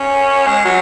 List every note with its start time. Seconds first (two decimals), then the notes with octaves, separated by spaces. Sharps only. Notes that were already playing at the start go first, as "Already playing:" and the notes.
Already playing: C#4
0.47 G#3
0.65 F#3